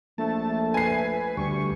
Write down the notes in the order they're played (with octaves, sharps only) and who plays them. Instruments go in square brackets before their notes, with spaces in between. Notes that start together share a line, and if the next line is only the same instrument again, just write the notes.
[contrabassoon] A#1 [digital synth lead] A3 [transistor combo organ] A5
[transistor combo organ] B4 [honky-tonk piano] G#5 C7
[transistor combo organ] D2 G3 [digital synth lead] C#6